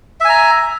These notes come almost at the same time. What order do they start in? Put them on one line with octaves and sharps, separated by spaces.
E5 G#5 A#5